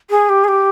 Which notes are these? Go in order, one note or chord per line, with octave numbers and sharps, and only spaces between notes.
G#4
G4
G#4
G4